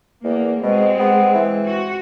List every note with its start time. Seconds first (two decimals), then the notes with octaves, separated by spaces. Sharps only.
0.24 E2 A#3
0.63 B2 G#3 C4
0.99 B3
1.34 E3
1.66 F#4